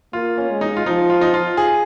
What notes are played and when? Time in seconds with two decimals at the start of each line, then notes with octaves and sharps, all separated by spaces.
0.13 A#3 F4
0.38 C#4
0.50 G#3
0.61 D#4
0.77 F4
0.86 F3 D#4
1.10 F4
1.21 D#4
1.34 F4
1.57 G#4